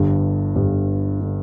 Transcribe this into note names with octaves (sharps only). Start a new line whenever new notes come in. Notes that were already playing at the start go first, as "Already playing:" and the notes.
Already playing: G1 G2 D3
G1 G2 D3
D3